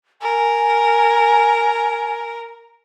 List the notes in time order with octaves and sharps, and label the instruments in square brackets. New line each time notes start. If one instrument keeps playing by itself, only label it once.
[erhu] A#4 [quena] G#5